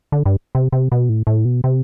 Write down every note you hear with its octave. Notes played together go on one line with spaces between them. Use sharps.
D3
G2
C3
C3
B2
A2
A2
B2
C3